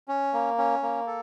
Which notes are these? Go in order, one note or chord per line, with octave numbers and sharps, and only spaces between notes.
C#4
A#3
C#4
A#3
A4